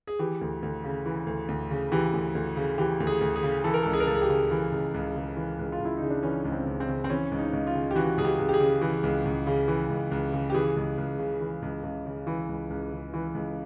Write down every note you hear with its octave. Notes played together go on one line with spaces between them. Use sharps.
G#4
E3 G4
D2
D2
C#3
E3
D2
D2
C#3
E3 G4
D2
D2
C#3
E3 G4
D2
G#4
D2
G#4
C#3
E3 A4
A#4
A4
C#2
G#4
A#4
C#2 A4
G#4
G4
C#3
E3
C#2
C#2
C#3
E3
C#2
F4
C#2
E4
C#3 D#4
D4
E3 C#4
C#2
C4
C#2
C4
C#3
C4
E3 C#4
C#2
D#4
C#2
F4
C#3
G4
E3 F#4
C#2 G#4
G4
C#2
G4
G#4
C#3
E3
C#2
C#2
C#3
E3
C#2
C#2
C#3
G4
E3 G#4
C#2
C#2
C#3
E3
C#2
C#2
C#3
E3
C#2
C#2
C#3
E3
C#2